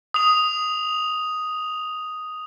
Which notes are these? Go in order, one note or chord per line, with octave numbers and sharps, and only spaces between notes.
D#6 F7